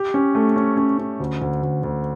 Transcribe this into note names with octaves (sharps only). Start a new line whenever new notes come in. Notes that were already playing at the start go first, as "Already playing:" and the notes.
Already playing: G4
C#4
A3
C#4
C#4
C#4
D2
D2
D2
D2